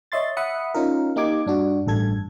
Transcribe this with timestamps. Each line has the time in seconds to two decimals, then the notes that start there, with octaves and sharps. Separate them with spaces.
0.12 C#5 D#5 E5 C6 A6
0.37 E5 F#5 B5 D#6 C#7
0.74 C#4 D#4 F4 A#4
1.16 A#3 D#4 G4 D6 G#6
1.46 G2 D4 F#4
1.87 A1 G2 A4 G#6